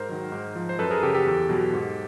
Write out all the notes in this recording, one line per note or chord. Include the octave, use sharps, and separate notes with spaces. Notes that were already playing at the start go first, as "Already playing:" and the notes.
Already playing: G#2 A#4 C5
D#3 F#3
G#2
F3
C5
F#2 A4 B4
G#4 A#4
C#3 F#3 G4 A4
G4 A4
E2
B2 F#3
G#2